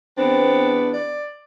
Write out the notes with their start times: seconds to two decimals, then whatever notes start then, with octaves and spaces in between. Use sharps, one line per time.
0.18 E2 B3 C4 D4
0.93 D5